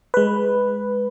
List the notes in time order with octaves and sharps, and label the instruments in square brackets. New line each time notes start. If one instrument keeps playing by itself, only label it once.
[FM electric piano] G#3 B4